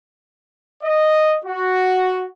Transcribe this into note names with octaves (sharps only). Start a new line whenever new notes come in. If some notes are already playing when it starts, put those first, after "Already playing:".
D#5
F#4